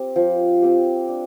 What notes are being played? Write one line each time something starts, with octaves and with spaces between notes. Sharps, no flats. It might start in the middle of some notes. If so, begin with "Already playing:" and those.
Already playing: C4 G4
F3
C4 G4
D4